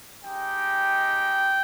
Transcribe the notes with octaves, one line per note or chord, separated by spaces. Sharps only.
G#3 D#4 G4 G5